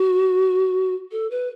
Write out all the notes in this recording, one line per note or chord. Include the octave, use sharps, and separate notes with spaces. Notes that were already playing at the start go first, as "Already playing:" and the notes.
Already playing: F#4
A4
B4